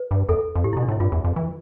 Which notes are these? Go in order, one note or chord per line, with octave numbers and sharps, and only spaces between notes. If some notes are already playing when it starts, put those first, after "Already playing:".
Already playing: B4
G2
E2 A4
F2
A2 G4
B2 E4
D4
A2 E4
G2 F4
E2
F2
E3